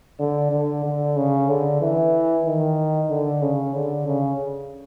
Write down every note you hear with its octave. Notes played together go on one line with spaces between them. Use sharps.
D3
D3
D3
C#3
D3
E3
D#3
D3
C#3
D3
C#3